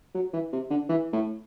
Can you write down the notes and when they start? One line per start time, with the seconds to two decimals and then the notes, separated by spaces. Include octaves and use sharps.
0.15 F#3
0.33 E3
0.53 C3
0.70 D3
0.89 E3
1.13 A2